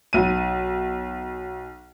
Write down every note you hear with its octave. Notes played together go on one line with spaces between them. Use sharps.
B1 D#7